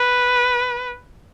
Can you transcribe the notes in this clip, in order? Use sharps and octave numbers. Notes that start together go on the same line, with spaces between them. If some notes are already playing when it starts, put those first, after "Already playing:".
Already playing: B4